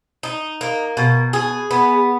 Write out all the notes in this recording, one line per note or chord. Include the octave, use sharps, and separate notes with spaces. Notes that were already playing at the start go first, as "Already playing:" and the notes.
D#4
A#3
B2
G#4
B3